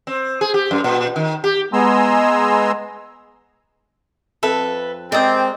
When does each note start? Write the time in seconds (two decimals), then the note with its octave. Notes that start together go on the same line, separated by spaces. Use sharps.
0.07 C4
0.41 G#4
0.54 G4
0.71 F#2
0.84 A#2
1.16 D#3
1.44 G4
1.73 G#3 B3 G#5 A#5 C6 E6
4.43 F2 A4 B4 E5
5.12 G#3 C4 A#4 D5 G5 D#6